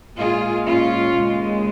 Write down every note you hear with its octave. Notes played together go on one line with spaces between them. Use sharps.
A#2 G#3 F4 G#4
C#4 F4
D#2 C#3 G#3